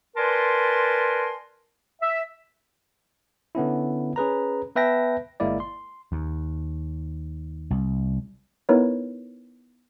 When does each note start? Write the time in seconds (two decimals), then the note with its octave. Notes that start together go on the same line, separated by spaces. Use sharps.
0.16 A#4 B4 D5 G#5 A5 C6
2.01 E5
3.55 D3 B3 C#4 E4
4.16 C#4 G#4 B4 A#5
4.76 B3 B4 E5 G5 A5 A#6
5.40 G1 G#3 A#3 E4 D5
5.60 C6
6.12 D#2
7.70 C2
8.69 B3 D#4 E4 A#4 B4 C#5